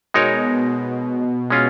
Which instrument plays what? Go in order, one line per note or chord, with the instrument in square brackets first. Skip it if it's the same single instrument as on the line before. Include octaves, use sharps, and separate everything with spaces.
[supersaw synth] B2 [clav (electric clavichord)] G#3 D#4 A#4 C#5
[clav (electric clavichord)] G#3 C#4 F4